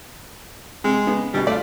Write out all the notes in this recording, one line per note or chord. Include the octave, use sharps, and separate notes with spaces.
C3 G#3
C#3 B3
D2 B2 G3
A3 F4 D5